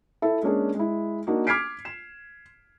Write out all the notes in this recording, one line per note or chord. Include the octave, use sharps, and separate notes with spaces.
E4 A4 E5
G#3 A#3 C#4 D4 G#4
G#3 E4
A#3 D4 D#4 F#4
D6 F6 G#6 B6 C7 D7
E7